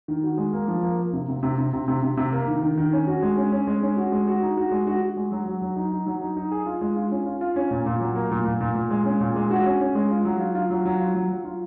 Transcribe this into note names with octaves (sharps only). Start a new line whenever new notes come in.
D#3
F#4
G#3
A#3
F3
A#3
A#3
C3
C3
C3
C3
C3
C3
C3
C3
A#3
D#3
D#3
D#3
C#4
F#4
G#3
C#4
C#4
G#3
C#4
F#4
G#3
F#4
D#4
F#4
G#3
F#4
F#4
G#3
F#3
F#3
F#3
D#4
D#4
F#3
D#4
D#4
G#4
F4
G#3
F4
C#4
F4
F4
C#4
A#2
A#2
F#3
A#3
A#2
A#2
A#2
A#2
G#3
C#4
A#2
G#3
F#4
C#4
C#4
G#3
F4
F#3
F4
F4
F#3
F#3
F4
F#3
F#3
F4